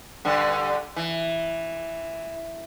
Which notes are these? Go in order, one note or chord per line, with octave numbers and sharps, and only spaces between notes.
G2 D3
E3